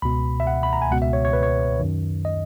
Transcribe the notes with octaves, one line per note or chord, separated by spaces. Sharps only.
C#2 B2 B5
E5
F#5
B5
A#5
G#5
C#2 B2 F#5
E5
C#5
C#5
B4
C#5
F#2 D#3
D#5